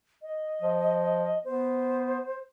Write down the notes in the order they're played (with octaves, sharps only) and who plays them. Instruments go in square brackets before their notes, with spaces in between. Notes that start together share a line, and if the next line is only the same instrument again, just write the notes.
[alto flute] D#5
[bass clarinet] F3
[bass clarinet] B3 [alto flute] C5